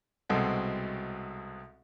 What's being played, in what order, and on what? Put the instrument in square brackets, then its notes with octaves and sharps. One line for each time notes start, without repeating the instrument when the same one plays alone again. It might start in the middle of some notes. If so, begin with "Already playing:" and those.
[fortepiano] C2 B2 G#3 C4 F#4 A4